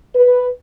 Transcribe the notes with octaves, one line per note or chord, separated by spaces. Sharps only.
B4